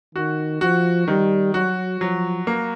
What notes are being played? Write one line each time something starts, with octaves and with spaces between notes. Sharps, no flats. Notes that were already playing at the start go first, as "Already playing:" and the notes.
D#3 F#4
F3 F#4
D#3 G3
F#3 F#4
F3 F#3
A#3